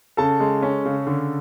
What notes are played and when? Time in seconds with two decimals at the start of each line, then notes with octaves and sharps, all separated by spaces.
0.17 C#3 A4 A5
0.40 G#3
0.62 C#4
0.86 C#3
1.07 D3